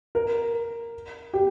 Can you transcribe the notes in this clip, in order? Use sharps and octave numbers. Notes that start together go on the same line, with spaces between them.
A#4
G4